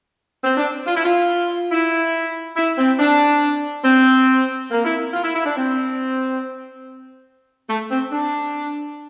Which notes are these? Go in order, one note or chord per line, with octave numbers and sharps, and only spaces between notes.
C4
D4
F4
E4
F4
E4
E4
C4
D4
C4
A#3
E4
F4
E4
E4
D4
C4
A3
C4
D4